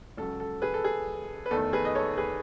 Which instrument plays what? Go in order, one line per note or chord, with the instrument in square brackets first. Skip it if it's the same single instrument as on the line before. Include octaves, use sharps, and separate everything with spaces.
[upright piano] C#2 C#3 F#3 A4
A4
G#4 B4
A4
G#4
B4
E2 D#3 A3 A4
G#4 B4
D#5
A4 C#5
G#4 B4